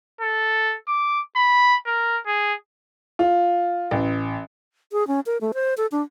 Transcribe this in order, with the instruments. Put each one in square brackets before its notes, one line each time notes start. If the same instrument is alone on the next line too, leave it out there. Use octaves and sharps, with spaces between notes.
[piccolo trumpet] A4
D6
B5
A#4
G#4
[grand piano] F4
A1
[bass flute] G#4
C#4
A#4
A3
C5
A4
D4